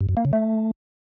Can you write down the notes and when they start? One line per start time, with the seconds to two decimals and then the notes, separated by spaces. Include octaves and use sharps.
0.01 G2
0.09 F#2
0.17 A#3
0.25 C#3
0.33 A3